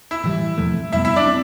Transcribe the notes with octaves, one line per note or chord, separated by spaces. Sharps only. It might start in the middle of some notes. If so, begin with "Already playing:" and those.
E4 E5
A2 E3 G3
E2 C3 F3 A3
F2 C3 G3 B3 E4 E5
E4 E5
D4 D5
C4